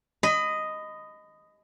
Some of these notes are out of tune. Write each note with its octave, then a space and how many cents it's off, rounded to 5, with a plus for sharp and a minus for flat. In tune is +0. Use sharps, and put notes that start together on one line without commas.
D#5 +0 B5 +30